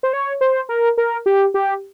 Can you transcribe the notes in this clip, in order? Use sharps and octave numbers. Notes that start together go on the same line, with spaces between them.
C5
C#5
C5
A#4
A#4
G4
G4